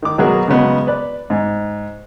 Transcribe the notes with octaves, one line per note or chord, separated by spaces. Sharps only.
D#3 D6
B2 F#3 F#4 G#4 A#4
C#3 F#3 G#3 B3
B4 D5
G#2